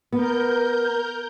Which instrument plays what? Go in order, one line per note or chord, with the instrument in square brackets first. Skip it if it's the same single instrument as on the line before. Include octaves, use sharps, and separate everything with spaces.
[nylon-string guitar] B3 [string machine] A#4 G6